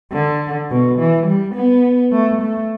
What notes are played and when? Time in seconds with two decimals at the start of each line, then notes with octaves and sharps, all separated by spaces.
0.13 D3
0.71 B2
0.99 E3
1.27 G3
1.55 B3
2.12 A3
2.42 A3